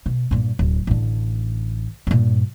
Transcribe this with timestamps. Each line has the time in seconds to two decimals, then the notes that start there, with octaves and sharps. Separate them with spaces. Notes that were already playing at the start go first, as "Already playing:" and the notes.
0.06 B2
0.31 G2 A#2
0.59 D1
0.87 A1 D3
2.07 G2 A#2